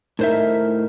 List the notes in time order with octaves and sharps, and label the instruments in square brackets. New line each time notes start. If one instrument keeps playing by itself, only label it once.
[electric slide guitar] A2 C5 E5 [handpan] D#4 A#4